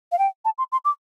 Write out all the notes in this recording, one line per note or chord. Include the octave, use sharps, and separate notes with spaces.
F5
G5
A5
C6
C6
D6